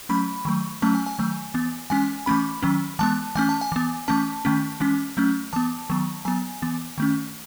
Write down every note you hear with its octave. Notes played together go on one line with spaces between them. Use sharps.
F#3 A3 C#4 B5
D#3 F#3 A3
F#3 A3 C#4 A5
G#5
G#5
D#3 F#3 A3
E3 B3
E3 G#3 C#4 G#5
E3 A3 C#4 B5
D#3 F#3 C#4
E3 G#3 B3 A5
E3 A3 C#4 G#5
A5
G#5
E3 B3
E3 A3 C#4 A5
D#3 A3 C#4
E3 G#3 C#4
F#3 A3 C#4
E3 B3 A5
D#3 F#3 B3
F#3 B3 G#5
E3 B3
D#3 A3 C#4